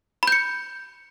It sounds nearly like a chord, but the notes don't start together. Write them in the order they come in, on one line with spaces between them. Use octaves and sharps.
B5 G6 C#7